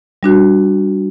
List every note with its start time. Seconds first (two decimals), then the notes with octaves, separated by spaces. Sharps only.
0.23 G3 D4 F#4